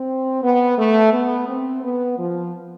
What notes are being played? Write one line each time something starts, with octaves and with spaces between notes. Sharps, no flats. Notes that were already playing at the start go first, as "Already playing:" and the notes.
Already playing: C4
B3
A3
B3
C4
B3
F3